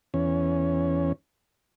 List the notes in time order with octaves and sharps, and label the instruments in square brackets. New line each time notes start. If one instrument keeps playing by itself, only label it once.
[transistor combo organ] E2 C#4